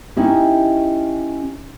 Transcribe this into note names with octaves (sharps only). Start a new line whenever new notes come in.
C#4 D#4 E4 G4